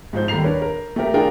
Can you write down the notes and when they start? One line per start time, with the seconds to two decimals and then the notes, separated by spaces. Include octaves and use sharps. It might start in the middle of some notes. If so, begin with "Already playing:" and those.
0.13 G#2 F3 C5 G6
0.28 D#2 G3 A4 A#5 C7 F7
0.43 D4 A#4 B4 C#5
0.62 A#4
0.96 A3 G4 A#4
1.14 D4 F4 G#4 A#4 G5